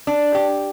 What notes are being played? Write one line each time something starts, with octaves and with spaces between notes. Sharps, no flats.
D4
G4